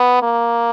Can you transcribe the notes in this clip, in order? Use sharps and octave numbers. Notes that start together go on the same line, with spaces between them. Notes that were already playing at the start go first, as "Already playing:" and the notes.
Already playing: B3
A#3